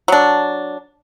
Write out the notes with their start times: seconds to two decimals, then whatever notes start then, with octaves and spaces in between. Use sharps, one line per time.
0.08 F#3 D4